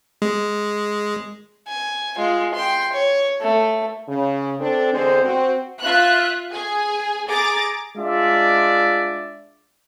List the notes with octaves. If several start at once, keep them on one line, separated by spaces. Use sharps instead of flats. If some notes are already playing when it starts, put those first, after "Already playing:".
G#3
G#5
G#3 F4
G5 C6
C#5
A3
C#3
C4 D4 A4
E2 D3 G#3 C4 G#4 C5
C4 F#4
F4 E5 F#6
G#4 G#5
G#4 A#5 D6 A6
G#3 D4 F4 D5 E5